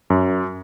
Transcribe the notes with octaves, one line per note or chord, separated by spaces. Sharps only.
F#2